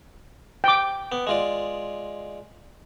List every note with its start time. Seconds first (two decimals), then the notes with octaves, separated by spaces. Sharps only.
0.64 G5 D6
1.12 B3
1.27 G#3 F4 D5